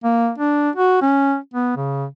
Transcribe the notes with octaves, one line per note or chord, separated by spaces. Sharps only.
A#3
D4
F#4
C#4
B3
C#3